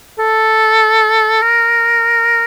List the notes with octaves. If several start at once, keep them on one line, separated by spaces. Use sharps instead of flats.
A4
A#4